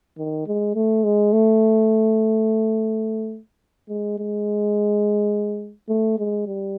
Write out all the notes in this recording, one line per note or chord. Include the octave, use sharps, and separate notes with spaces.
D#3
G#3
A3
G#3
A3
G#3
G#3
A3
G#3
G3